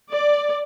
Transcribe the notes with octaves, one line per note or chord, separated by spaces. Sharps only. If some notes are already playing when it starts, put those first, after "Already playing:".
D5